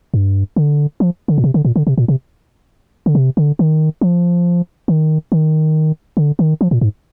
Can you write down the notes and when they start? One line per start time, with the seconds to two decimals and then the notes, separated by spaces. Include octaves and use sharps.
0.14 G2
0.56 D3
1.00 F3
1.28 D3
1.38 A#2
1.44 C3
1.54 D3
1.65 A#2
1.76 D3
1.87 C3
1.98 A#2
2.08 C3
3.06 D3
3.15 C3
3.37 D3
3.59 D#3
4.01 F3
4.88 D#3
5.32 D#3
6.17 D3
6.39 D#3
6.61 F3
6.71 A#2
6.81 G#2